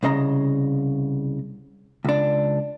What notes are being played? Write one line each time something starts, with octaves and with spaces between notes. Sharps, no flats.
C2 C#3 D#5 A#5
C#2 D4